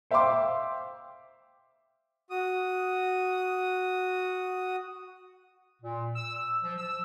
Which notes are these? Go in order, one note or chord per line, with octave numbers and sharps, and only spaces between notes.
C5 E5 F5 G5 C6 D6
F#4 D#6
A#2
E6
E6
F3
E6